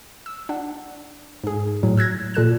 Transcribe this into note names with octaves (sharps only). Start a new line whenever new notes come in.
E6
D4 F#5
G#2 G#4
A2 F#3
E6 F#6 G#6 A#6
A#2 A4 F#6 E7